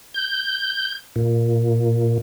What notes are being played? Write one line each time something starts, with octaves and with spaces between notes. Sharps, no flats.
G6
A#2